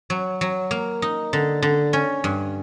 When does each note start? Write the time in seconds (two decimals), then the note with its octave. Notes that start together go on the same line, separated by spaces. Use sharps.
0.10 F#3
0.41 F#3
0.71 A#3
1.02 D#4
1.33 D3
1.62 D3
1.93 C#4
2.24 G2